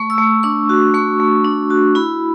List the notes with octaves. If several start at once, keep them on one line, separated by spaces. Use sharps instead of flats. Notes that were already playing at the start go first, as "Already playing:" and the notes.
Already playing: A3 C#6
E6
A3
D4 C#6
F#4
A3 C#6
A3
D4
F#4
E4 B5